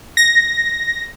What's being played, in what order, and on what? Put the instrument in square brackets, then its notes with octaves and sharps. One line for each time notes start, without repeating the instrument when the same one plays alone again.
[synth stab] A#6